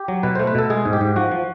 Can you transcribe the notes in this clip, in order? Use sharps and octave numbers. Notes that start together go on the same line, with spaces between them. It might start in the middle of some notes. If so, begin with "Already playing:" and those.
Already playing: G4
F#3
B2 B4
A3 C5
B4
B2 A4
G#3 G#4
G#2
G4
G#2
F3 F#4
F3